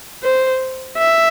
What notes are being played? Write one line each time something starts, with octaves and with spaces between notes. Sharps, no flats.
C5
E5